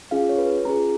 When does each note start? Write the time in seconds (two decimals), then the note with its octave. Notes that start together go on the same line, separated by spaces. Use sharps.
0.11 C#4 F4 G#4 F5
0.29 C#5
0.38 B4
0.65 C#4 F4 G#4 A#5